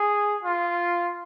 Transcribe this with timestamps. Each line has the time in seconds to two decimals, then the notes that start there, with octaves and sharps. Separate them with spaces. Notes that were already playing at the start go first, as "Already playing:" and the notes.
Already playing: G#4
0.43 F4